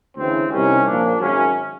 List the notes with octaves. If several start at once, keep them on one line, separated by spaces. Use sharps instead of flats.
D2 C#3 E3 C4
C2 C3 D#3 G3 C#4
A#1 A#2 F3 D4
G#1 F#2 C#3 F#3 C#4